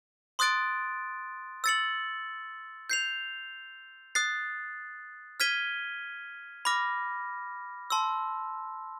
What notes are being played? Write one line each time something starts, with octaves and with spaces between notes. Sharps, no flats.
C6 D#6 F#6 A6 D7
E6 A6 C#7 F#7
G6 C7 F7
D#6 F#6 A6 C7
F6 G#6 B6 D#7 G7
B5 D6 F6 A#6
A5 C6 E6